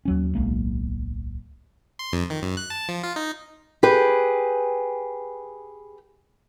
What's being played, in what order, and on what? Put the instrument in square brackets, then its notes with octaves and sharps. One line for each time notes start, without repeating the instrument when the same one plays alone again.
[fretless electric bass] D#2 F#3 C#4
D1 B1 G#3 A#3
[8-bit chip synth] C6
F2
D#3
F#2
F#6
A5
F3
F4
D#4
[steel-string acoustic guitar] G4 G#4 B4